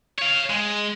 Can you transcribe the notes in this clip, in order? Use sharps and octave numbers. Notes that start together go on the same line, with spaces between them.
C#5 F5
G#3